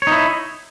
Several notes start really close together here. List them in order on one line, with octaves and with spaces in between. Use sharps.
C#5 D#4 E4